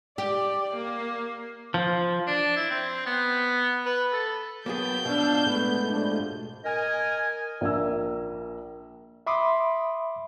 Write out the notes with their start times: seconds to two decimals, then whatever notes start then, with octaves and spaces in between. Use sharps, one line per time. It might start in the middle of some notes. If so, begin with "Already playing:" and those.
0.18 G4 D5
0.75 A#3
1.74 F3
2.27 D4
2.56 E4
2.70 C4
3.06 B3
3.86 B4
4.12 A4
4.66 F#3 A#3 B3 G#4 G5 A5 B5 G6
5.05 G#2 B2 F3 D4 F5 E6
5.46 A2 G#3 A3 B3
5.88 F3 G3 D4
6.65 A#4 D#5 G#5
7.61 A#1 A#3 E5 E6
9.27 E5 B5 C6 D6 D#6